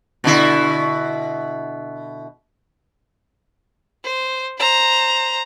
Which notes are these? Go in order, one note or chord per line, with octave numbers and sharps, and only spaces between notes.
B2 D3 E4
C5
C5 A#5